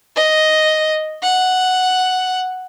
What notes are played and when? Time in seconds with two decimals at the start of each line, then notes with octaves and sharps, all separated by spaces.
0.16 D#5
1.23 F#5